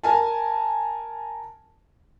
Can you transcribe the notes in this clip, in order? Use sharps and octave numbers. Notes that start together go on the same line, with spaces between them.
A#4 G#5 A5